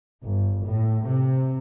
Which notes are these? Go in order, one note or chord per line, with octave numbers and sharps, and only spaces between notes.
G1
A2
C3